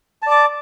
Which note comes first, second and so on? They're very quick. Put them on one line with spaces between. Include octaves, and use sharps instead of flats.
A5 D5 D6